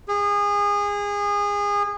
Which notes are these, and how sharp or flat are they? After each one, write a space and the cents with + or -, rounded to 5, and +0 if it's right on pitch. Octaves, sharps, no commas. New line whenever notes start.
G#4 -25